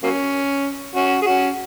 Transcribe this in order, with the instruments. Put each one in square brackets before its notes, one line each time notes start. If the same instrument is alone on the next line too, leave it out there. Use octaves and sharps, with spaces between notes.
[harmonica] F#3 A#3 C#4
C#4 F#4
G#4
C#4 F#4